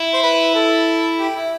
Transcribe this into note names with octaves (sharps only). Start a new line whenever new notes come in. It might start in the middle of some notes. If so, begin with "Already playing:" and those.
Already playing: E4
C5
B4
A4
G4
E4